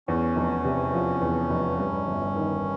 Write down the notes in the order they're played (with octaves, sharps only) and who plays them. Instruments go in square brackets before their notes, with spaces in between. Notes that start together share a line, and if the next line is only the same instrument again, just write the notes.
[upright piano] E2 [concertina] C#4
[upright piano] F1
C3
F3
E2
F1
G2
G1
D#3